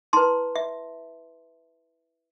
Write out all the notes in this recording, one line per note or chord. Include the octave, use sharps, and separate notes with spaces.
E4 B4 A5 C6
E5